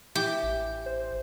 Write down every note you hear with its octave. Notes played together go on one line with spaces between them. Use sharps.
E3 G4
A1
C5